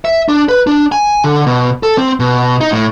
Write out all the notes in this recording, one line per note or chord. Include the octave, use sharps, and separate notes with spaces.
E5
D4
B4
D4
G#5
D3
B2
A4
C4
B2
D#4
A2